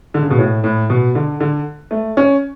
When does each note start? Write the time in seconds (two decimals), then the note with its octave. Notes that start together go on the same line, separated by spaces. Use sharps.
0.14 D3
0.23 C#3
0.30 B2
0.39 A2
0.64 A2
0.90 B2
1.15 D3
1.40 D3
1.91 A3
2.17 C#4